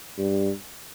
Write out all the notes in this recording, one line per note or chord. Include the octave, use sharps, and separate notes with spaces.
G2